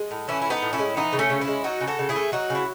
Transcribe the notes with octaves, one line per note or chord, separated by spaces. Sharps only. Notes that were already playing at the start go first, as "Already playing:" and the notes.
Already playing: G#3
A2
E3 C#4 E4
E4
A2 B3 D#4
A2
C#4 E4
G#3
E3 B3 D#4
C#3
A3 C#4
C#3
C#4 E4
G#3
F#3 D#4 F#4
C#3
F#4 A4
C#3
E4 G#4
A3
F#3 D#4 F#4
C#3
E4